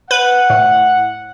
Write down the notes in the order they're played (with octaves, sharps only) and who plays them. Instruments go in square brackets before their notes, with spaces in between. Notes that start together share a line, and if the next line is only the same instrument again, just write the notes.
[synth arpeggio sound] B4 [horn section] F#5
[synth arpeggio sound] A2